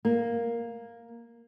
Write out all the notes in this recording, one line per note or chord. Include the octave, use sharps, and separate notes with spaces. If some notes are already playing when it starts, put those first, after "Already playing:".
A#3